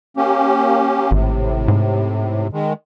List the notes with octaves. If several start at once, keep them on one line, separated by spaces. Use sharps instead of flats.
A#3 C#4 G4
G#1 A2 C3
G#2
D#3 G#3